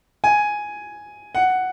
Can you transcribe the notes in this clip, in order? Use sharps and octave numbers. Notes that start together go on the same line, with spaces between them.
G#5
F#5